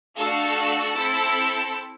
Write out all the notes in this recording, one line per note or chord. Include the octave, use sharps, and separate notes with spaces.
A3 D4 F#4 A4 F5
C4 E4 A4 A5